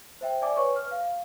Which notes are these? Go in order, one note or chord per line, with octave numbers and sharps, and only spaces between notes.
C5 E5 G5
D5 E5 G#5 D6
B4 C#5 C#6
F6
F5